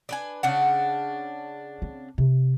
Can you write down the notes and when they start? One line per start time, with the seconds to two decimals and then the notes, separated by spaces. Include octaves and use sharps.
0.09 D4 B4 G#5
0.43 C#3 D4 F#5
1.82 C4
2.18 C3